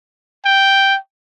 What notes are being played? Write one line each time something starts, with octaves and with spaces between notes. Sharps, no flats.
G5